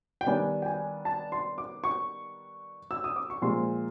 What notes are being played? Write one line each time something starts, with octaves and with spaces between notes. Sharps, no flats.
G5
D#3 G3 B3 D4 G#5
G5
G#5
A5
C6
D6
C#6
E6
D#6
D6
C#6
A#2 F3 G#3 C6